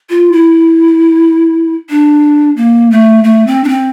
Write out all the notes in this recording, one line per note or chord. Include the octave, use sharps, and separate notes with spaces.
F4
E4
D4
A#3
A3
A3
C4
D4
C4